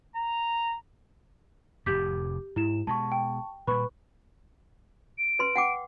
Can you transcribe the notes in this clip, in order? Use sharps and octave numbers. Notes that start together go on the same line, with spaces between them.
A#5
F1 F2 A2 G4 D6 G6 B6
G#2 E4 E7
B2 G#3 A5 C#6
G5
A#2 G3 B4 B5 C#6
D7
B4 C6
F#5 G5 D6